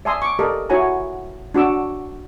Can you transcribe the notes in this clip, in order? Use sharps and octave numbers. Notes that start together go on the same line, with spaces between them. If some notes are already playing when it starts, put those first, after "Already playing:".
D5 E5 G#5 A5 C6 D#6
C#6 D6
G4 A4 A#4 D5 D#5
E4 F#4 C#5 F#5 G#5 A#5
D4 F#4 D6 E6